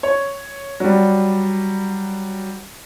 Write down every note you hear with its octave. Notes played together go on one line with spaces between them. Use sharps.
C#5
F#3 G3